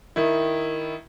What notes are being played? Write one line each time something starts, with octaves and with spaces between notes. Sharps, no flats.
D#3 E4